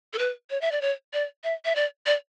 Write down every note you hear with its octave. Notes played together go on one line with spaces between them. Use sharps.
A4
B4
C#5
E5
D5
C#5
D5
E5
E5
D5
D5